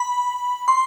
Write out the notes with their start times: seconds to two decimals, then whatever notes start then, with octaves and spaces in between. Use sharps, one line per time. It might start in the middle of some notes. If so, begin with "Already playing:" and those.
Already playing: B5
0.68 C6